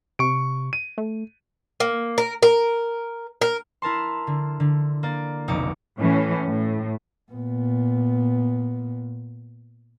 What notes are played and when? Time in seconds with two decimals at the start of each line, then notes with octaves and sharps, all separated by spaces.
0.19 C3 C#6 D7
0.73 D#7
0.98 A3
1.80 A#3
2.18 A#4
2.43 A#4
3.41 A#4
3.82 E4 A#4 A5 C6
4.27 D3
4.60 D3
5.03 A#3 D5
5.48 F1 B1 D#4 D6 C#7
6.00 A2 E3 C#4
6.47 A2
7.32 A#2 B3